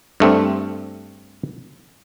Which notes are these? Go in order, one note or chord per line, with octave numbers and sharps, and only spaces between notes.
G2 A3 C4